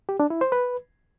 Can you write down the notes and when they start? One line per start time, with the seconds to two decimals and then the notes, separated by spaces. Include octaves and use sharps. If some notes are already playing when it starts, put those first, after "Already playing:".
0.09 G4
0.20 D4
0.30 E4
0.41 C5
0.52 B4